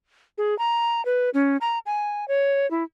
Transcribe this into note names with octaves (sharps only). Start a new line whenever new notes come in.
G#4
A#5
B4
C#4
A#5
G#5
C#5
E4